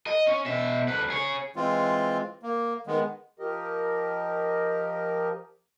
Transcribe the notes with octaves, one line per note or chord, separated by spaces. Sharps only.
D#5
C#4
B2 E5
D2 B4
G#4 C#5
E3 G#3 C4 F4
A#3
D#3 G#3 B3
F3 G4 A#4 D#5